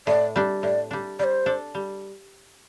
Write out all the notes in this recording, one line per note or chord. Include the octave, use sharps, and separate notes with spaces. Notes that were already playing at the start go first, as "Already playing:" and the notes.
A2 D5
G3 D4
A2 D5
G3 D4
G3 C5 D5
D4 A4
G3